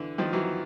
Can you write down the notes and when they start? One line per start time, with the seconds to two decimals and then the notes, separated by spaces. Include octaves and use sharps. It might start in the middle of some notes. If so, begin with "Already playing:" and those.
Already playing: D3 E3
0.18 D#3 F3
0.33 E3 F#3